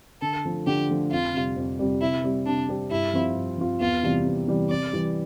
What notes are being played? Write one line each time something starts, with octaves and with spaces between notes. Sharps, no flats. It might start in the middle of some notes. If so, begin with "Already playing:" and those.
D3 A4
F3 A3
D3 G4
F3 A3
F2 F4
C3 G3
F2
C3 G3
C3 E4
G3 C4 G4
C3 D4
G3 C4 G4
G2 E4
F3 C4 F4
G2
F3 C4 F4
E2 F4
C3 E3 G3
E2
C3 E3 G3
C3 D5
E3 G3